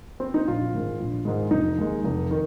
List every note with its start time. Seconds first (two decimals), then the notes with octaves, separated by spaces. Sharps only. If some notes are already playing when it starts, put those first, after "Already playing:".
0.20 C4
0.34 D#4
0.48 A#1 F4
0.73 G#2 D#3 G#3
1.00 A#1
1.25 G#2 D#3 G#3
1.51 F1 D#4
1.78 D#2 D#3 G#3
2.04 F1
2.31 D#3